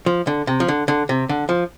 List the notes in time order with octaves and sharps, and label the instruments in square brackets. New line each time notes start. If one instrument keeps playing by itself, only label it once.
[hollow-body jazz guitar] F3
D3
C3
F3
D3
D3
C3
D3
F3